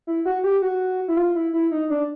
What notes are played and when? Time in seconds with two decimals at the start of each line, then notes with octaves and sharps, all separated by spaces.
0.07 E4
0.25 F#4
0.44 G4
0.62 F#4
1.08 E4
1.17 F4
1.35 E4
1.53 E4
1.71 D#4
1.90 D4